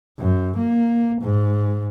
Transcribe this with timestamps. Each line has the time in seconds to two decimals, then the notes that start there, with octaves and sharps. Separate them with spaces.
0.19 F#2
0.58 A#3
1.22 G#2